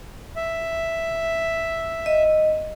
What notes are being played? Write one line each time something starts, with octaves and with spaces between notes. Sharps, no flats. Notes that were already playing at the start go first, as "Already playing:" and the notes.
E5
D#5